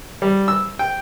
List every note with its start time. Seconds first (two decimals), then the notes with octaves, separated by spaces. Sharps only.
0.22 G3
0.48 E6
0.79 G5